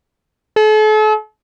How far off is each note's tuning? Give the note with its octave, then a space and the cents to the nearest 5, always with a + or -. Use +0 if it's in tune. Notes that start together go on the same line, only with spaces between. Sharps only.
A4 -40